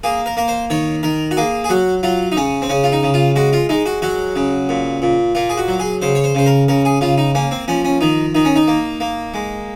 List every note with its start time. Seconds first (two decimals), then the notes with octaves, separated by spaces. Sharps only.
0.04 A#3 G#4
0.26 A#4
0.37 A#3 A#4
0.48 C5
0.70 D#3 C#5
1.03 D#3 A#4
1.31 F#4
1.37 A#3 G#4
1.64 G#4
1.69 F#3 F#4
2.03 F#3 F4
2.32 D#4
2.37 C#3 C#4
2.62 C4
2.70 C#3 C#4
2.84 F4
2.92 D#4
3.03 C#3
3.14 F4
3.36 G#3 F#4
3.53 F4
3.69 G#3 D#4
3.86 F#4
4.02 F#3 F#4
4.36 C#3
4.69 A#2
5.02 A#2
5.35 A#2 F4
5.49 G#4
5.57 F#4
5.68 F#3
5.80 G#4
6.02 C#3 C5
6.15 C#5
6.24 C5
6.35 C#3 C5
6.46 A#4
6.68 C#3 A#4
6.85 G#4
7.01 C#3 F4
7.18 D#4
7.35 A#3 C#4
7.51 C4
7.68 F3 C#4
7.85 C#4
8.01 D#3 D#4
8.35 D#3 D#4
8.45 C#4
8.56 D#4
8.68 A#3
9.00 A#3
9.34 G#3